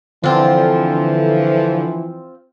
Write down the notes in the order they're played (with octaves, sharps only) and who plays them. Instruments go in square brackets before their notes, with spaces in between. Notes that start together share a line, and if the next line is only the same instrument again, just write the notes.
[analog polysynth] D3 [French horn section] E3 F3 [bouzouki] C4 F4